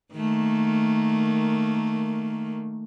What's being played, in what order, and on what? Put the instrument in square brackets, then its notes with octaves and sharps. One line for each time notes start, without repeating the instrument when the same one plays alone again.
[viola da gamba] D#3 A3 A#3